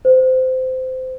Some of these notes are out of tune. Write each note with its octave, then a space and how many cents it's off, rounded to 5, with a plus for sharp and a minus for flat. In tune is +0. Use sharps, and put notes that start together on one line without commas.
C5 -20